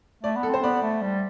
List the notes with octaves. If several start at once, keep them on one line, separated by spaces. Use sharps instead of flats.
A3 D5
B3
A4
C4 C5
B3 D5
A3
G3